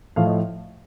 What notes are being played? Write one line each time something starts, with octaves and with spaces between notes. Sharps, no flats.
A2 F3 A3 F5
D#5